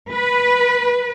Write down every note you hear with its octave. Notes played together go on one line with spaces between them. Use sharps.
B4